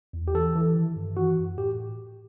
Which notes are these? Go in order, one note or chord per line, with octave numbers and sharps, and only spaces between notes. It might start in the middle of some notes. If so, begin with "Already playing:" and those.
E2
G4
E3 A4
E3
D#3
G2
E3 F#4
F#2
A2 G4